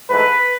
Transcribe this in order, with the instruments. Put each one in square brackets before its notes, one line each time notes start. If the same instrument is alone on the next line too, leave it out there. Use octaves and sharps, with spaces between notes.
[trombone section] G#2 E3 A3 B4